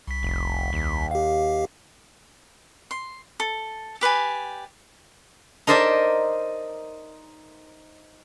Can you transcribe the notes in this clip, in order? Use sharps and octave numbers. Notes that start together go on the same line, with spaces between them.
C2 B6
F1
D#2
G4 F5
C6
A4
G4 B4 D5 G#5
D#4 A#4 C5 D5 E5 A5